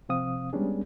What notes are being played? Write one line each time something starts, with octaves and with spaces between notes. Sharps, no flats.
C3 F3 C4 F5 D#6
G3 G#3 B3 C#4 D4 G#4